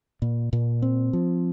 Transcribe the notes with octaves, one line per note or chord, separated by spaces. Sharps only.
A#2
A#2
C4
F3